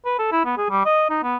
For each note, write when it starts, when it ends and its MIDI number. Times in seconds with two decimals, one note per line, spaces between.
0.05 0.15 71
0.19 0.28 69
0.32 0.43 64
0.45 0.54 59
0.57 0.69 68
0.70 0.84 55
0.86 1.07 75
1.10 1.22 63
1.23 1.37 59